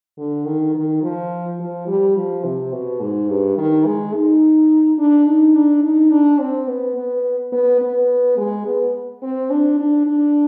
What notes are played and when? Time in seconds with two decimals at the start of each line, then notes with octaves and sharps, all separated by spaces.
0.18 D3
0.46 D#3
0.74 D#3
1.03 F3
1.60 F3
1.87 G3
2.16 F3
2.44 C3
2.73 B2
3.01 G#2
3.29 G2
3.58 D#3
3.85 G#3
4.14 D#4
4.99 D4
5.27 D#4
5.55 D4
5.83 D#4
6.11 D4
6.40 C4
6.68 B3
6.96 B3
7.52 B3
7.81 B3
8.37 G#3
8.66 B3
9.22 C4
9.50 D4
9.79 D4
10.07 D4